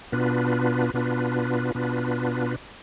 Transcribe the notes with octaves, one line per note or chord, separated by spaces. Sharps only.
B2 B3 D4 F4 B4
B2 B3 D4 F4 B4
B2 B3 D4 F4 B4